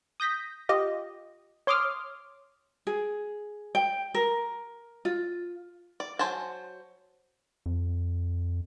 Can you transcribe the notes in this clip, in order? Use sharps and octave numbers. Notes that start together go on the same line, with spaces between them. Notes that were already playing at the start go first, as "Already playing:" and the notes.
D#6 G6 A#6 B6
F4 G4 D#5
C#5 C6 D6 D#6 F6
G#4
G5
A#4
F4
D5
F#3 C5 G#5 A5
F2